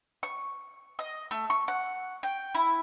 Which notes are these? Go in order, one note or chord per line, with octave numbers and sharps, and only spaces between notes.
C#6
D#5
A3
C#6
F#5
G5
E4